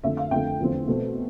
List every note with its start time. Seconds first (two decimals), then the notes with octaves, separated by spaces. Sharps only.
0.04 F2 D3 A3 E5
0.17 F5
0.31 F2 D3 A3 G5
0.60 E2 D3 F3 A3 C4
0.88 B2 A3 C4